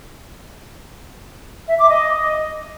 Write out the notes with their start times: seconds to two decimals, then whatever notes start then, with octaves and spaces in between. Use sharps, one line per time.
1.67 E5
1.78 D6
1.90 D#5